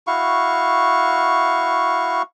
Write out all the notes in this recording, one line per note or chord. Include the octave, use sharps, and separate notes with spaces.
E4 F#4 F5 C#6